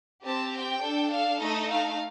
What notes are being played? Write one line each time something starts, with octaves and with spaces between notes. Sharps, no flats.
C4 G4 A5
G5
D4 A4
F5
A3 D#4 A4 D#5
F5